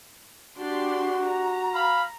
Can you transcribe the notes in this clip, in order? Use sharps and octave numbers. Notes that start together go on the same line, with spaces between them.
D4 F#4 G4 C6
A#5
F5 B5